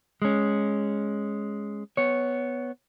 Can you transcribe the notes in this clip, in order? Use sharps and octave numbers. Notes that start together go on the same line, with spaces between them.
G#3 C#4
B3 C#5